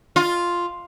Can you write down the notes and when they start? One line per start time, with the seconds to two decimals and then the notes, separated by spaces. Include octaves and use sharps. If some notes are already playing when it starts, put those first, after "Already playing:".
0.16 F4